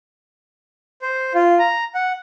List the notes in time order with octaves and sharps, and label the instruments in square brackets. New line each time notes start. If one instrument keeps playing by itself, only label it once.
[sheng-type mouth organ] C5
F4
A#5
F#5